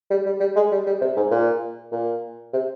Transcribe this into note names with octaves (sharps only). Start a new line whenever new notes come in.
G3
G3
G3
G#3
G3
G3
C3
G#2
A#2
A#2
C3